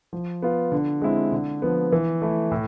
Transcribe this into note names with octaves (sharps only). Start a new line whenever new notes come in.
F3
B3 F4
D3
G#3 C4 E4
D3
F3 B3
E3
A3 E4
A2